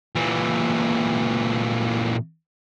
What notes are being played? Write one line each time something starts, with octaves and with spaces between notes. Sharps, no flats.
A#2 E3